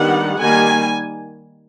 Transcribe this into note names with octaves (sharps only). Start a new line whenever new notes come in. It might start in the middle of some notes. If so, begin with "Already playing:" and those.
Already playing: D#3 G3 B3 D4 F#5
D#3 G3 A#3 G#5